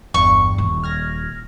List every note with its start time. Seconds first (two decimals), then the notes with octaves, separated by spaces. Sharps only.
0.14 G1 E2 G2 C#6
0.58 D#1 D#2
0.84 F6 G#6 A#6